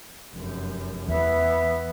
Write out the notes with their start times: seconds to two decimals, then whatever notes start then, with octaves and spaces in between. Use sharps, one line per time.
0.33 F1 F#2
1.08 E2 E3 B3 E5